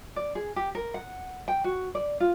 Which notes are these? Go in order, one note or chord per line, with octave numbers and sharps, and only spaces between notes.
D5
G#4
G4
A#4
F#5
G5
F#4
D5
F4